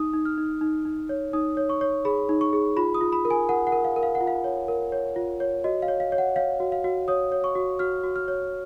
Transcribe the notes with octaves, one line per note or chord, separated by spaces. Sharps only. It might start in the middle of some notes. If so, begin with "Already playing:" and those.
Already playing: D#4 D#6
D#4
F6
D#4
D#4
D#4
C#5
D#4 D#6
C#5
C#6
C#5
G#4 B5
D#4
C#6
G#4
F4 B5
D#6
F4
B5
A#4
G#5
A#4 F#5
F#5
A#4
F5
A#4
F5
F#5
F4
F5
C#5
A#4
C#5
F4
C#5
F#4 D#5
F5
C#5
F5
C#5
F#5
C#5 F5
F#4
F5
F#4
C#5 D#6
C#5
C#6
F#4
F#4 F6
F#4
F6
C#5